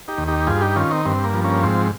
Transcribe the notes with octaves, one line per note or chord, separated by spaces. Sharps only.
D#4 G4
D#2
D#4 G4
G2 F4 G#4
D#4 G4
D#3 C#4 F4
C4 D#4
G2 C4
A#3
F3
A#3 C#4
G#2 C4